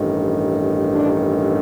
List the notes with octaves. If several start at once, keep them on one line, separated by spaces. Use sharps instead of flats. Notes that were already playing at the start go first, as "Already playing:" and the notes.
Already playing: A1 G2 D#3
D4